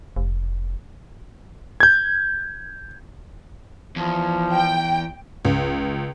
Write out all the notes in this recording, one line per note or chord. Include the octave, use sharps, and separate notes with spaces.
F1
G6 G#6
E2 F3
G5
C#2